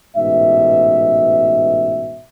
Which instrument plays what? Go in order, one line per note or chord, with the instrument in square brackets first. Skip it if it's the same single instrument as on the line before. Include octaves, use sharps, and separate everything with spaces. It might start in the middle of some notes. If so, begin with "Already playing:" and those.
[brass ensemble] A1 G#2 B2 E5